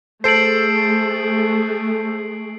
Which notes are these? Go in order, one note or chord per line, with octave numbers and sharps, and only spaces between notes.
A3 G#4 A4 C5 C7 D7 F#7